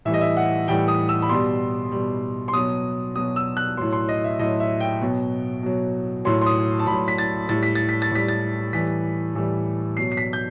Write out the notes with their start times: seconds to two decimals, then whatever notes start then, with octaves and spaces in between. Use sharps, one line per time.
0.05 A2 E3 G3 E5
0.14 D#5
0.21 E5
0.37 F#5
0.68 A2 E3 G3 G5
0.88 D#6
1.09 E6
1.22 B5
1.29 B2 G3 C6
1.92 B2 G3
2.48 C6
2.53 B2 F#3 D#6
3.15 B2 F#3 D#6
3.36 E6
3.57 F#6
3.77 A2 F#3 C6
3.93 C6
4.09 D#5
4.24 E5
4.39 A2 F#3 D#5
4.60 E5
4.81 G5
5.01 B2 F#3
5.63 B2 F#3
6.25 A2 F#3 C6
6.41 C6
6.46 D#6
6.79 A5
6.87 A2 F#3 B5
7.08 B6
7.18 A6
7.49 A2 G3 A6
7.63 B6
7.75 A6
7.89 B6
8.02 A6
8.11 A2 G3 B6
8.28 A6
8.73 A2 E3 G3 B6
9.35 A2 E3 G3
9.97 B2 F#3 C7
10.12 C7
10.17 B6
10.33 G6